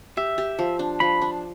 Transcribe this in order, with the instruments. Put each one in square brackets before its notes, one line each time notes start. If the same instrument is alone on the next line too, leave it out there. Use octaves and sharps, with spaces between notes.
[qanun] G4 [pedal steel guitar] E5
[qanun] G4
F3
D4
[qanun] F3 [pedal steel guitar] B5
[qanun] D4